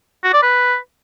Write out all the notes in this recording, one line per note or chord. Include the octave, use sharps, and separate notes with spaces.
F#4
D5
B4